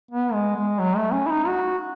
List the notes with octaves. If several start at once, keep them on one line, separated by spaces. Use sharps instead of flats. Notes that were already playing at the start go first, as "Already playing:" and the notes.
B3
G#3
G#3
F#3
A3
C#4
E4
D#4
F#4